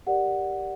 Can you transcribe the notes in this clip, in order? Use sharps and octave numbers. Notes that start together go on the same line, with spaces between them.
G4 A#4 D5 F#5